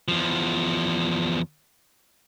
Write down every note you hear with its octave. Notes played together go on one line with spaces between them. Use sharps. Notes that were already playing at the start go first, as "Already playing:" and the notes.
E2 F3